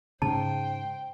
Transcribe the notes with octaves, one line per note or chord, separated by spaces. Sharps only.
G#2 C#3 C5 G5 A5